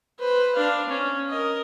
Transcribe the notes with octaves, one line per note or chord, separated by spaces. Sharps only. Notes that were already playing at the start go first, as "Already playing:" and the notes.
B4 C5
D4 F5
C#4
A#4 D#5